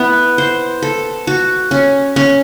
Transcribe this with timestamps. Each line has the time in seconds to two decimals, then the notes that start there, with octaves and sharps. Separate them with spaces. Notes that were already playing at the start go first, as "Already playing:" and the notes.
Already playing: B3 E4
0.38 C5
0.82 A4
1.27 F#4
1.71 C#4
2.16 C#4